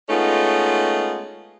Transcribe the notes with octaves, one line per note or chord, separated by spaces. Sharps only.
G#3 A3 B3 C#4 D#4 F4